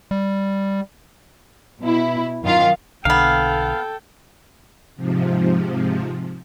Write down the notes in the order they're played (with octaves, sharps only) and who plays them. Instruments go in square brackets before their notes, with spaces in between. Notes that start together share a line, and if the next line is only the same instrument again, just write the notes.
[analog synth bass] G3
[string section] B2 E4
F#2 D#3 F4 F5
[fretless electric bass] B1 D3 [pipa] A#3 B3 [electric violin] A4 G5 [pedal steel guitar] F5
[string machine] G#2 C3 F3